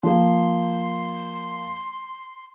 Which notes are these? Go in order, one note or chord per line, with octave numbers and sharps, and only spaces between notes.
F3 A#3 C6